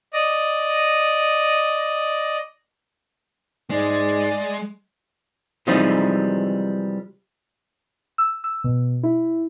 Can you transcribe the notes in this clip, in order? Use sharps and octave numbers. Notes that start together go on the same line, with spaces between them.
D5 D#5
G#2 G#3 D5
C3 E3 F3 G3 G#3 D#4
E6
E6
B2
E4